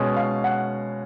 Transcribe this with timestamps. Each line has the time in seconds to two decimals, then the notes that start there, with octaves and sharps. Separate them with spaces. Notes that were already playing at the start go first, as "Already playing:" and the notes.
Already playing: B2 G#3 C#4
0.16 F5
0.44 F#5